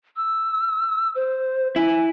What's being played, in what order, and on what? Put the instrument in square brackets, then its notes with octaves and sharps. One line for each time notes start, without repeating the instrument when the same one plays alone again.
[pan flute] E6
C5
[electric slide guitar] E4 [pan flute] G#5